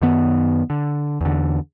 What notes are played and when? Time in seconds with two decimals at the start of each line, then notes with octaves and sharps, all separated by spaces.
0.02 F#2 D#3 B3
0.70 D3
1.21 E2 D3